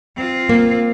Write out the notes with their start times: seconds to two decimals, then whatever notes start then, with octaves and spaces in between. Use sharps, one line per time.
0.16 C4 F4
0.49 A#3